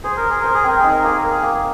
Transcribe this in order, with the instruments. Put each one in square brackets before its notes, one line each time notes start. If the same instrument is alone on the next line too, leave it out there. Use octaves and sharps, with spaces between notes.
[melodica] G#4 [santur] C5
[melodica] A#4
[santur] C5
[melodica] G#4
[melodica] A#4 [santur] C5
[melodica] G#4
[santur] C4 [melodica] A#4
[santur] D#4 [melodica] G#4
[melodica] A#4
[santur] A#3 [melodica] G#4
[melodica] A#4
[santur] A#3
[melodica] G#4
[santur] A#3